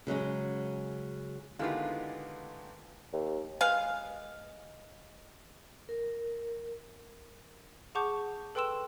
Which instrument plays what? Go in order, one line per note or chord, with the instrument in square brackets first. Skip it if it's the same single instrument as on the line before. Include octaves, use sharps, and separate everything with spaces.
[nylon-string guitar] C#3 F#3 G#3 C#4
[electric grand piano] D3 D#3 G4 [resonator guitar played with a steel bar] G#3 B3 F4 [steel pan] E4 F5
[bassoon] D#2
[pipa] G#3 B4 F5
[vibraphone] A#4
[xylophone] G#4 F#5 A5 C#6 D6 G6
A4 B4 G5 C6 E6 E7